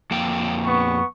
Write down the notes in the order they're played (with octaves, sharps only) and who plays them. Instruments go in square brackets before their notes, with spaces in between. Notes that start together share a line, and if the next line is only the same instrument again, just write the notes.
[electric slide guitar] F2 A#3 G5
[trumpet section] B3 C#6